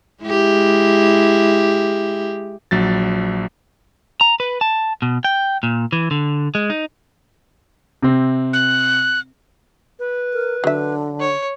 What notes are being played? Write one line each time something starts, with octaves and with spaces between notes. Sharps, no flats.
G#3 E4 G4
A#1 F#3 A6
A#5
B4
A5
B2
G5
A#2
E3
D3
G#3
D#4
C3 C4
F#6
B4
A#4
D3 F#3 E5
C#5